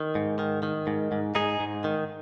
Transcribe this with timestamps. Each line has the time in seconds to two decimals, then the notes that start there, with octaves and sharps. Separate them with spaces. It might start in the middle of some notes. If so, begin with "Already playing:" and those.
Already playing: D#3
0.15 G#2
0.39 D#3
0.63 D#3
0.87 G#2
1.12 G#2
1.35 G#2 D#4 G#4
1.60 G#2
1.84 D#3